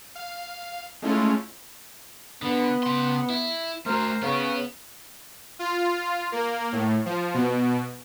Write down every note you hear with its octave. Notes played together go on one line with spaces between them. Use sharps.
F5
G#3 A3 C#4 E4 F4
D3 B3
C#3 C6
E4
A3 F#4 A#4 C5
C#3 B3
F4
A#3
A2
F3
B2